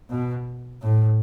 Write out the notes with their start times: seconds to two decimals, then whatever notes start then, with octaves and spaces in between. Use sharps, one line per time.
0.10 B2
0.82 A2